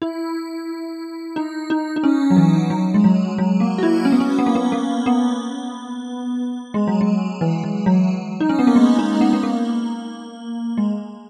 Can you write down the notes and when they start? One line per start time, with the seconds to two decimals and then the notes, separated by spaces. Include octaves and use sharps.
0.02 E4
1.36 D#4
1.70 D#4
1.96 D#4
2.04 C#4
2.30 F#3
2.36 E3
2.70 F#3
2.94 G#3
3.04 F#3
3.38 F#3
3.60 A#3
3.78 F#4
3.83 E4
4.05 C#4
4.12 B3
4.20 C#4
4.39 B3
4.46 A#3
4.55 B3
4.72 A#3
5.06 B3
6.74 G#3
6.88 F#3
7.01 G#3
7.41 E3
7.64 E3
7.86 F#3
8.40 D#4
8.49 C#4
8.59 B3
8.67 A#3
8.76 G#3
8.99 D#4
9.21 B3
9.33 B3
9.43 A#3
10.78 G#3